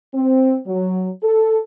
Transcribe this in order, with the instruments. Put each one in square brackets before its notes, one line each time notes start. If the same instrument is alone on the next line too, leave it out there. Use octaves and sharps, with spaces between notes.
[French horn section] C4
F#3
A4